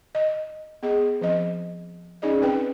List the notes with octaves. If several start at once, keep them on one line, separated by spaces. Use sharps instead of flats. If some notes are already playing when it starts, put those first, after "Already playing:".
D#5
B3 G#4 D#5
F3 C4 D#5
C#4 D#4 G#4 D5 D#5
C4 D#4 B4 G5